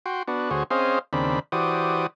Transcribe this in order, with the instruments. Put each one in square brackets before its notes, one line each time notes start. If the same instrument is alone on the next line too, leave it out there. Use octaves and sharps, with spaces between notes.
[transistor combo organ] F#4 G5 C6
B3 D4 F#4
D2 F#4 G#4 C5 C#5
C4 C#4 G#4 C5 D#5 F5
D#2 C#3 C4 D4 B5
E3 F#4 G4 C5 D5 D#6